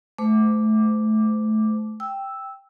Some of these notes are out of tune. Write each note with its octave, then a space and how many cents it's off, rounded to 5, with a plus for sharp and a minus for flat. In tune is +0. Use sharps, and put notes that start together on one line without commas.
A3 -25 C5 -40 D6 +0
G5 +0 E6 +0